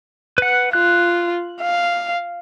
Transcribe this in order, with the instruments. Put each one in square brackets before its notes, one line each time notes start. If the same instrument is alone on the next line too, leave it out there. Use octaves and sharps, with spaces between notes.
[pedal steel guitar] B4 F#5
[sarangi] F4 [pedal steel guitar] F#6
[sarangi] F5